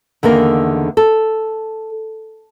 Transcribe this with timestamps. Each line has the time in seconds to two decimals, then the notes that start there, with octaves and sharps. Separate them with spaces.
0.23 E2 D3 D#3 A#3 A#4
0.97 A4